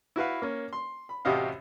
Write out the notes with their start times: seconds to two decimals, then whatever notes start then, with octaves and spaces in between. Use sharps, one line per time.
0.16 E4 F#4 B4 F5
0.42 A#3 C#4
0.73 C6
1.09 B5
1.25 A1 C3 F#4 G4 D#5 F5